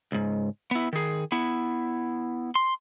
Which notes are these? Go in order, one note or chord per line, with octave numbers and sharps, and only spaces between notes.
C#2 G#2
B3 E4
D#3 G#4
B3 E4
C6